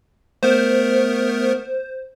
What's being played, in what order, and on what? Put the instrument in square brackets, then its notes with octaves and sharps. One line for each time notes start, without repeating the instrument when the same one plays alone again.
[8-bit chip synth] A3 B3 A#4 [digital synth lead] C5